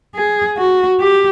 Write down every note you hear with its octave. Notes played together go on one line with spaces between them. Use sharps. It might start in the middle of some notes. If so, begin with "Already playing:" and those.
G#4
F#4
G4